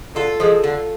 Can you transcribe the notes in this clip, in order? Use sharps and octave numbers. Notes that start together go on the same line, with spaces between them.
D3 F4 A4
F3 G#3
D3